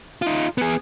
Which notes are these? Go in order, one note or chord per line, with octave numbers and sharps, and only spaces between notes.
D#4 F4
B3 G#4